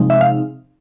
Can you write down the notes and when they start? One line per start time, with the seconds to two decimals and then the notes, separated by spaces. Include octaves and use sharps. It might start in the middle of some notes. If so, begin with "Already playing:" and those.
Already playing: C3 F3 G#3 C4 D#4
0.10 E5
0.21 F5